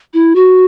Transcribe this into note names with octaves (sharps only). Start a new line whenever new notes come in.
E4
F#4